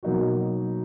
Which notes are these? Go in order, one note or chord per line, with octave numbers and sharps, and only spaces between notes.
B2 F#3 A#3 D#4 F#4